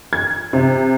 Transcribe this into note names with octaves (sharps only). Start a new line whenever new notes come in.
G#6
C3